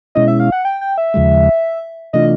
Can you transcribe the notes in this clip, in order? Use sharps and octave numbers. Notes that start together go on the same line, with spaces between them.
B2 G#3 C#4 E4 D#5
E5
F5
F#5
G5
G5
E5
D#2 C#3 F3 G#3
C3 E3 A3 D4 F4 D#5